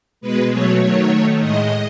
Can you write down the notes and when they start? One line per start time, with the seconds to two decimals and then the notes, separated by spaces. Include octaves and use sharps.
0.21 B2 G#3 B4
0.51 B2 F#3 A3 C#5
0.81 D#3 F#3 A3 C#5
1.11 D#3 A3
1.40 A2 G#3 D#5